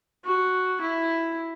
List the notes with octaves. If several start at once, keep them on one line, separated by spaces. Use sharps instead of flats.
F#4
E4